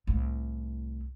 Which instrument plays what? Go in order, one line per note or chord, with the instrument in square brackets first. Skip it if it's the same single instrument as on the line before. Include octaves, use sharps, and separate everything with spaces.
[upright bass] C2 A2